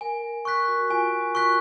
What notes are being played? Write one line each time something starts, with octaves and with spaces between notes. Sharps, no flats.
A#4 G#5
A#4
A#4 C#6 F#6 B6
F#4
F4 G#5
F#4
C#6 F#6 B6